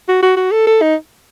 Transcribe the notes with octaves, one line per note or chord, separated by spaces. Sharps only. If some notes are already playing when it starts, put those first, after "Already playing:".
F#4
F#4
F#4
A4
A4
D#4